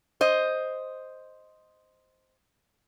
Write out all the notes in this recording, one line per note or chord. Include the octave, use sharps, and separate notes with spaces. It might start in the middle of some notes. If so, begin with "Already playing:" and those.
C5 D#5